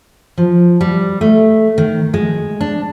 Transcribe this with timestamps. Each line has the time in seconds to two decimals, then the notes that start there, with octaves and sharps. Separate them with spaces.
0.38 F3
0.81 G3
1.21 A3
1.78 D#3
2.14 G#3
2.61 D4